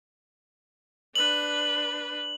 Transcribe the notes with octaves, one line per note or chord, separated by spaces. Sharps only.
D4 B4 F#7